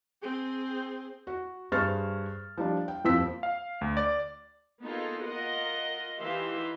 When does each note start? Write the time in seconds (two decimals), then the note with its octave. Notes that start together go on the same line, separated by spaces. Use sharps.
0.22 C4 G#4
1.27 F#4
1.72 G2 G#4 C5 C#6 F6 A6
2.57 F3 G3 D4
2.88 G5
3.04 D#1 F2 F3 C5 E6 B6
3.43 F5
3.81 D2
3.97 D5
4.83 A#3 B3 D#4 F4 G#4 A4
5.24 F4 A#4 D#5 F#5
6.18 E3 D#4 G4 E5 F5 C6